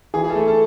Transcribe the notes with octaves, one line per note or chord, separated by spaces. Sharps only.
E3 G#4
G#4
A4
A3
A4